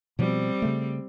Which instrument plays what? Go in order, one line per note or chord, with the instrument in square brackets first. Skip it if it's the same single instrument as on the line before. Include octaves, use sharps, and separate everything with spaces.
[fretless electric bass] B2 F3 [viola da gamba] G3 C4
[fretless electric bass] C#3 A3